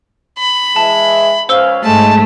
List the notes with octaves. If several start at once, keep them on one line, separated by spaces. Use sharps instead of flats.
B5
E3 G#3 E5 A5
C#2 C#4 C5 F5 E6 G7
G#2 G#3 A3 A5